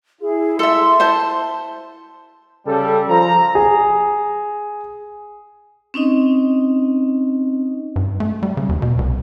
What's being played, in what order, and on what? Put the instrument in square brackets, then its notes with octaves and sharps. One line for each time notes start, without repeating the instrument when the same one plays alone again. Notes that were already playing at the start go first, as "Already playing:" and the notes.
[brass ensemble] E4 [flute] G#4
[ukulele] A4 E5 [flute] C6
[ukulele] C5 A5
[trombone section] C#3 A4 [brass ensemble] G3
[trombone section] F3 [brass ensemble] A#5
[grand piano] G#4
[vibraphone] C4 C#4 D#4 D#5
[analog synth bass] G2
A3
G3
C#3
D#2
B2
C2